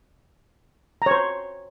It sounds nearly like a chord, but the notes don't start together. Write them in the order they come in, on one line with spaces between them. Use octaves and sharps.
A#5 C#5 C5